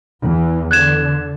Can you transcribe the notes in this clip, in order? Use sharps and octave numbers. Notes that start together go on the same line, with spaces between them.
E2 E3
D3 F#6 G#6 E7